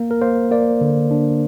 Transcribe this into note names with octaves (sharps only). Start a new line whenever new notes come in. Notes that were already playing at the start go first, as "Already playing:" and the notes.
Already playing: A#3
A#4
A#3 C5
A#3 D5
D3
D4